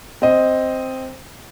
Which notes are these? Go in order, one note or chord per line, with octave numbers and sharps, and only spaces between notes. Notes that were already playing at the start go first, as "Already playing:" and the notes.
C4 D#5